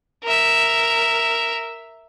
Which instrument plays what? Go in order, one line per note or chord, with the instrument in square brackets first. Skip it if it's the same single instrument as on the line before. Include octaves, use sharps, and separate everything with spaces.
[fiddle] A#4 E5